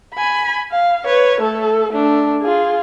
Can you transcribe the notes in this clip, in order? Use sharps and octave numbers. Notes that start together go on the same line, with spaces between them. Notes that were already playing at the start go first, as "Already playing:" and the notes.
G#5 B5
F5
B4 C#5
A3 A4
A3 D4
F4 G#4